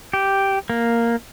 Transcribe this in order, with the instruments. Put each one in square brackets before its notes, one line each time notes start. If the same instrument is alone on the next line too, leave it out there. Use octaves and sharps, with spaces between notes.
[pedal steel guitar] G4
A#3